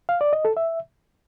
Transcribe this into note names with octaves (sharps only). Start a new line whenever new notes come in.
F5
D5
D#5
A4
E5